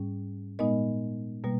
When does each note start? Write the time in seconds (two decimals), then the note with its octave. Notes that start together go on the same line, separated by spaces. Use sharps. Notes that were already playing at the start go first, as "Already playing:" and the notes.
Already playing: G#2 G3 C#4
0.59 A#2 G#3 B3 D#4 D#5
1.44 B2 G3 A#3